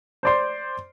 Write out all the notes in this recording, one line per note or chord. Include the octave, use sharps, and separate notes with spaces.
C5 D5 C6